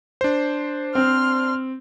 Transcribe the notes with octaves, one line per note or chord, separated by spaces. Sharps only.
D4 C5
C4 C6 F6